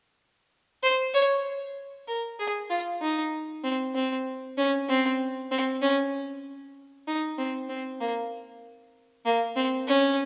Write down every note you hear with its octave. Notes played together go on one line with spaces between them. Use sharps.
C5
C#5
A#4
G#4
F4
D#4
C4
C4
C#4
C4
C4
C#4
D#4
C4
C4
A#3
A#3
C4
C#4